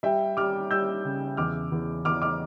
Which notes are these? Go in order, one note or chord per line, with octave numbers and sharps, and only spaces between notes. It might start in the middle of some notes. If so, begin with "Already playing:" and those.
G3 E5 G5
G3 D6 F6
G3 E6 G6
C#3
E2 D6 F6
E2
E2 D6 F6
D6 F6